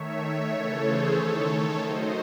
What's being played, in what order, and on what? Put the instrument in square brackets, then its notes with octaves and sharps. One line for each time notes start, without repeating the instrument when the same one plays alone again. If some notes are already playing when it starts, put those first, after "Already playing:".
Already playing: [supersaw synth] D#3 A3 C#5 E5
C#5 E5
C#3 E3 A3 A4 C#5
G#4 C5
D#3 A3 A4 C#5
D#3 F#3 A3 C5 D#5